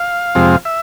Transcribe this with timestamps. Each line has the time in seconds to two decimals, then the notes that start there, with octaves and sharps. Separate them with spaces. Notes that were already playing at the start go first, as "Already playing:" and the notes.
Already playing: F5
0.35 F2 C3 F3 G#3 C4
0.65 E5